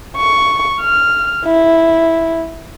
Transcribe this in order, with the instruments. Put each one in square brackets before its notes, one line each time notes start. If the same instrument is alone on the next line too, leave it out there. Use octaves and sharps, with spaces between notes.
[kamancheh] C#6
F6
E4